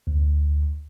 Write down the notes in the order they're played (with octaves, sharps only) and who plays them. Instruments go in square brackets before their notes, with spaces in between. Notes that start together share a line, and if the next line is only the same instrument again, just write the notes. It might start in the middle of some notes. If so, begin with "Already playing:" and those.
[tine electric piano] D2